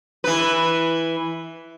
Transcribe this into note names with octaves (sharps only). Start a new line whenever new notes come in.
E3 B4